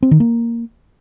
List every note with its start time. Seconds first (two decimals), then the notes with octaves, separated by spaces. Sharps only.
0.03 C4
0.11 D#3
0.20 A#3